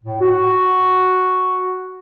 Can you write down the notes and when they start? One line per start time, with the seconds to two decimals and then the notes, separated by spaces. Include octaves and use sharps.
0.04 A2
0.21 F#4